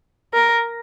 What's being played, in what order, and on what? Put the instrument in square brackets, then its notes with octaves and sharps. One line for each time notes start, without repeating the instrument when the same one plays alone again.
[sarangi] A#4